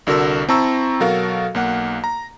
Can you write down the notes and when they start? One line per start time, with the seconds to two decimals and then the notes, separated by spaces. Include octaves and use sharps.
0.07 C2 D3 F#4 A#4 E6
0.49 C4 E4 A5 A#5 C#6 E6
1.00 B2 F#3 F#4 A4 A#4 F5
1.55 B1 A#3 F#5
2.04 A#5